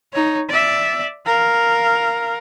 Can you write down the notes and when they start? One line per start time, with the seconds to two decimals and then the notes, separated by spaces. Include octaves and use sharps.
0.13 D#4 C#5
0.49 D5 E5
1.26 A#4 F5